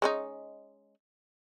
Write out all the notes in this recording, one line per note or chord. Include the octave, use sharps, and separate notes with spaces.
G#3 C#4 D#4